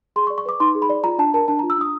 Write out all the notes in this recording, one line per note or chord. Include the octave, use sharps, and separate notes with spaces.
G#4 C6
C#6
D5
C#6
B4 D6
D#4 C6
G#4
B5
D5
F4 A#5
D4 A5
A#4 A5
D4 A5
A#5
F4
E6
D4 D#6